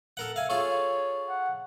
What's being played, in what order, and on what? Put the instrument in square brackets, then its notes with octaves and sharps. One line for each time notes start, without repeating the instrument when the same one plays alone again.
[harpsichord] A4 A#4 F#5
[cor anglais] E5 [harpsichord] F5 G#5
[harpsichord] F4 G#4 A4 [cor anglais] C#5
[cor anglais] F#5